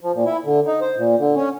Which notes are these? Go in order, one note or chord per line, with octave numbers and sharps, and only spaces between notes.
F3
A#2
E4
D3
D#4
C5
A#2
D3
C#4